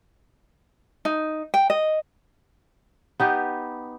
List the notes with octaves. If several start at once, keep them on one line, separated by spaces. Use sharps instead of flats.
D#4
G5
D#5
B3 D#4 G4